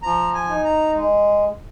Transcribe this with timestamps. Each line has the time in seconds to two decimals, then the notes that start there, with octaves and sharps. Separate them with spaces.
0.03 F3 A#5
0.34 G#5
0.49 D#4
0.64 A#5
0.94 G#3